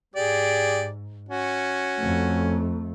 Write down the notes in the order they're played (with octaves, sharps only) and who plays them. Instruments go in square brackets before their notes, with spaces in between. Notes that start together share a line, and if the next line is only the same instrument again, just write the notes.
[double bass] G#2 [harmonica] G4 G#4 D5
[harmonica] C#4 F#4
[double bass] F2 A3